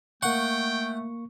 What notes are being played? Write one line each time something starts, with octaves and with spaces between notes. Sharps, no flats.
A3 A#3 F#5 G5 C#6